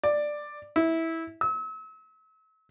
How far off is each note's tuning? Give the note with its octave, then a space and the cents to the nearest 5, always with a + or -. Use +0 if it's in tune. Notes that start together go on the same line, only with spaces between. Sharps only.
D5 +10
E4 -15
E6 -40